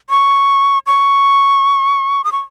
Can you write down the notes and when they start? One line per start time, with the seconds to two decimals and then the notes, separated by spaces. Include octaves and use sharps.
0.10 C#6
0.87 C#6
2.24 D#6
2.32 C#6